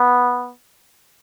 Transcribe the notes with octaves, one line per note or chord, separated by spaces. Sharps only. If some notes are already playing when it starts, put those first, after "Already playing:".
Already playing: B3